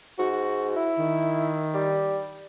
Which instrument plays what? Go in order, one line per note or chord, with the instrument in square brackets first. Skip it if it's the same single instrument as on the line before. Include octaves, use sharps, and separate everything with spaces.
[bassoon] G#2 [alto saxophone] F#4
[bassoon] E4
[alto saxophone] D#3
[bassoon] G3